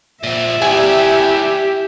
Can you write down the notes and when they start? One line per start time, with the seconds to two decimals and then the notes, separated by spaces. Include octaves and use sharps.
0.23 A#2 F3 E5
0.62 E4 G4 D5 G#5